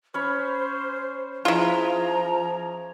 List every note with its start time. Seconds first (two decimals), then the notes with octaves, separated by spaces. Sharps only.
0.14 C#4 C5 C#5 B5
1.45 F3 E4 F4 G#4 A#5